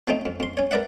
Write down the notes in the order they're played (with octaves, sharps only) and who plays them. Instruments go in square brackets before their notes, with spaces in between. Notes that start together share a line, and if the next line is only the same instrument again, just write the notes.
[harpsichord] F3 A3 C4 D#4
F2
F2 C6
C#4 C#5
A#4 B4 D5 E5 F#5